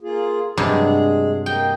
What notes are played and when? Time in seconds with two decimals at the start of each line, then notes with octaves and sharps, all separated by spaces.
0.01 A#3 F4 G#4
0.57 G2 C3 F#3 G#3 G#4
1.46 A#3 D#5 G5